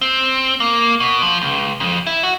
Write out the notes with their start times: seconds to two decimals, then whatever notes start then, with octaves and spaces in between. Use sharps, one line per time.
0.01 C4
0.60 A#3
1.00 B2
1.22 F3
1.42 C#2
1.80 F2
2.06 E4
2.23 F#4